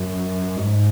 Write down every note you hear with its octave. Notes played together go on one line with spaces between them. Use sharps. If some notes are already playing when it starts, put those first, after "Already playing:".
Already playing: F#2
G#2